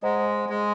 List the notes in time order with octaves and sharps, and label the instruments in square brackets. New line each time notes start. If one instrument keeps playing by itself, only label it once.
[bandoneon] G#3 [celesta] C5 D#5 F#5 A#5
[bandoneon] G#3